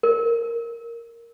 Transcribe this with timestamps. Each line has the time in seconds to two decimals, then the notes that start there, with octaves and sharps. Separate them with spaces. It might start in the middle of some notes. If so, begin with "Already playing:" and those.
0.03 A#4